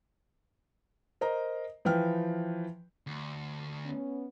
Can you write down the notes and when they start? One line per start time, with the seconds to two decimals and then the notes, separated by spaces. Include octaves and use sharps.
1.21 A#4 C5 D#5 A#5
1.85 E3 F3 B4 G5 F6
3.07 D2
3.84 B3 C#4